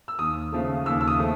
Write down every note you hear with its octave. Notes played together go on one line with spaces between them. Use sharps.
E6
D#2 D#6
C#3 F3 A3
D#2 E6
E6
D#6
C#3 F3 A3